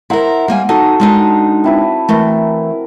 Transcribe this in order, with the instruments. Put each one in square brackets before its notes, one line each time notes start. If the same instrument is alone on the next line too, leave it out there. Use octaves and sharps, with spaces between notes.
[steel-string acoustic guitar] E4 A#4 [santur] C5 F#5 A#5
[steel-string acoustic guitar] G3 A#3 G#5
[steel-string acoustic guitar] D#4 [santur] F#4 A4
[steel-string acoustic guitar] G#3 D4 D#4
[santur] C4 E4 B4
[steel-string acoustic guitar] E3 A3 [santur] A#4